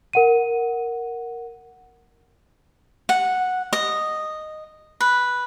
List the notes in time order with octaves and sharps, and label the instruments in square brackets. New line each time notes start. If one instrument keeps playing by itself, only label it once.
[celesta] A#4 F#5 D#7
[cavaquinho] F#5
D#5
B4